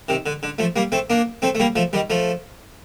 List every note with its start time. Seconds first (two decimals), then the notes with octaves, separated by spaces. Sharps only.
0.09 C3 D#3
0.26 D3
0.43 D3
0.58 F3 A3
0.76 G3 A#3
0.92 A3 C4
1.10 A#3 D4
1.42 A3 C4
1.55 A3
1.60 G3 A#3
1.76 F3 A3
1.93 D#3 G3
2.10 F3 A3